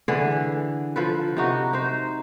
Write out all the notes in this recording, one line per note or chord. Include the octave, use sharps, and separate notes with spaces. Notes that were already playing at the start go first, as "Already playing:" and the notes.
D3 E3 G#4
F3 A4 B4
C3 D#4 F#4
D#4 C5